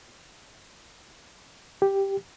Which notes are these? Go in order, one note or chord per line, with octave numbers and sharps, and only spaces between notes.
G4